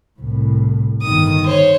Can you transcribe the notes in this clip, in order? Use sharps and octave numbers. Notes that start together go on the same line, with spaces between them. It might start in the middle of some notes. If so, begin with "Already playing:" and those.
C2 A2
G1 D#3 D#6
C5 C#5